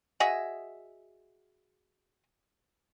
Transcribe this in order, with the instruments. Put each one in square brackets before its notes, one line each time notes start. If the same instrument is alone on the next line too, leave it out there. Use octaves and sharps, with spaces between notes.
[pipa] F#4 G#4 D#5 E5